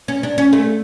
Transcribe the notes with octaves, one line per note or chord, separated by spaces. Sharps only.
C#4
D4
C#4
A3